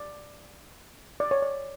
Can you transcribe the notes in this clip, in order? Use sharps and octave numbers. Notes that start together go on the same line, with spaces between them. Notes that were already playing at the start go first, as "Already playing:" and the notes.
Already playing: D5
D5
C#5
D5